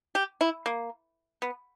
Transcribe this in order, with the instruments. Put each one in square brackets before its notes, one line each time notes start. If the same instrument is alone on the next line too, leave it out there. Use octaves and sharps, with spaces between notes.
[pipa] G4
E4
A#3
B3